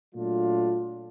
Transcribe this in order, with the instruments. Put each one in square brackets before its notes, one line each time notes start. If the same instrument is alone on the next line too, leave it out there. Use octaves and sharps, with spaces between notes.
[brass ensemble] A#2 F#3 A3 D4 F4